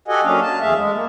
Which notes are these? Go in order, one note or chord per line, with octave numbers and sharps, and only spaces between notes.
F#4 G4 A4 D#5 F#5 G#5
F#3 A#3 C#4 D4 F5
A5
E2 A3 G#4 E5 F5
G#3
A#3